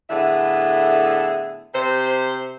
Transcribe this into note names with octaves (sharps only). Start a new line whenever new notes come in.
A2 D3 B3 G#4 E5
C3 C5